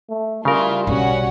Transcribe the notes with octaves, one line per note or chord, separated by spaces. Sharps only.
A3
C#3 G3 E4 F4 A#4
B1 G3 C#4 F#4 F#5